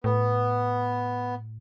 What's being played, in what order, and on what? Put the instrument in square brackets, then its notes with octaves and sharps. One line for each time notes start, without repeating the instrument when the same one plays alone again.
[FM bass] A2 [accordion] B3